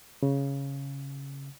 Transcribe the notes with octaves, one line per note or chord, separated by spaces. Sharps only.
C#3